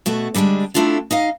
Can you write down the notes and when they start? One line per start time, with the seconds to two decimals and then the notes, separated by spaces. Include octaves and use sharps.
0.06 B2 A3 F#4
0.34 D3 G3 G#3 C4 D4
0.74 A3 C4 D4 E4 F4 A4
1.11 D#4 D#5 F5